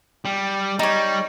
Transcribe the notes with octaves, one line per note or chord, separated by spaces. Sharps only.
G3
G3 D#4 C#5